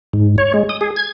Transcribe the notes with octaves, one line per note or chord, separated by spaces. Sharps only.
G#2
C#5
G#3
D#6
G#4
G#6